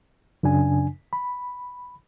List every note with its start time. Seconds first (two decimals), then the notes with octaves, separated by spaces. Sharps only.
0.43 F#2 C#3 D4 G#5
1.13 B5